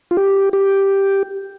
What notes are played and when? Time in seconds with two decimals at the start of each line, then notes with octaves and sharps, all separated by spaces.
0.11 F4
0.17 G4
0.53 G4